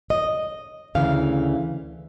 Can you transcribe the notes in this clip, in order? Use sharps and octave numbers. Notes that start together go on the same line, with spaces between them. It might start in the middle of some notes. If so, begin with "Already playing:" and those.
D#5
D2 C#3 E3 F5